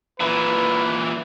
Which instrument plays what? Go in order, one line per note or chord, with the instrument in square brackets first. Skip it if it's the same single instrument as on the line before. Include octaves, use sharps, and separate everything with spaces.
[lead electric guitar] A#2 E3 [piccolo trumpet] B4